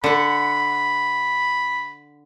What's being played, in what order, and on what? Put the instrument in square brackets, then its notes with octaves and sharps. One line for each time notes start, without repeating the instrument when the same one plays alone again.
[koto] D3 F#5 [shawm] B5